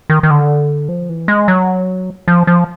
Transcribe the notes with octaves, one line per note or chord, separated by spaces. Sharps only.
D#3
D#3
D3
F3
E3
G#3
F#3
F3
F3